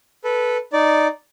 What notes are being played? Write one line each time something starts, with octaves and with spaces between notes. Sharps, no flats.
A4 B4
D#4 D5